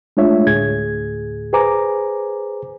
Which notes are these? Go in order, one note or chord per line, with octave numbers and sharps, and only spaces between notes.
G#3 A3 D4 F4 C#5 E5
D2 A2 G#4 G#6
G#4 B4 C5 G#5 A#5 D6